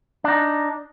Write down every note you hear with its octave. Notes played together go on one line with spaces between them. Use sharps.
D4 D#4